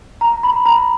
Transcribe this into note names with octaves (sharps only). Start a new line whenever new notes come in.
A#5
B5
A#5